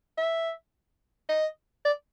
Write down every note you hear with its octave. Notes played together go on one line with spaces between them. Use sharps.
E5
D#5
D5